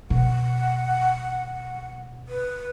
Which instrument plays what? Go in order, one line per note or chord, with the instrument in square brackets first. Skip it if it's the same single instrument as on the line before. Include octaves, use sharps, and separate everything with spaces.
[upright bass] B2 [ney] F#5
[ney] B4